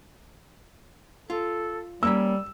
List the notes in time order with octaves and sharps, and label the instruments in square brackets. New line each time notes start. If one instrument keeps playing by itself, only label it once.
[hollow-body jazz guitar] F4 [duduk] A4
[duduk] G3 [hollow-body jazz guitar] A#3 C#4 B5 [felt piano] E6